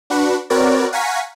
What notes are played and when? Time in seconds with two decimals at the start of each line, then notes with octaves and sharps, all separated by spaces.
0.10 D4 F#4 B4 F#5
0.50 C4 F#4 A#4 B4 C#5 D5
0.92 F5 F#5 G#5 A#5 C#6 B6